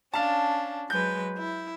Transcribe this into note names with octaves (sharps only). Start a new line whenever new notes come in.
C#4 D4 F5 A5
F#3 G#3 B4 G6
E4